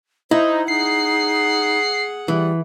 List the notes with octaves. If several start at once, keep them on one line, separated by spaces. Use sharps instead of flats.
D#4 E4 C5
D#4 G#4 F#5 C7
E3 G3